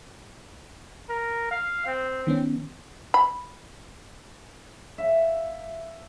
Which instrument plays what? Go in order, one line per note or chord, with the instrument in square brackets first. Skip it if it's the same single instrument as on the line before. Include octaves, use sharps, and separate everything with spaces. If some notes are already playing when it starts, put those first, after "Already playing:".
[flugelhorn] A#4
F5
C4
[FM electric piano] D#3 B3 C#4
[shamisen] B5
[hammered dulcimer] E5 F5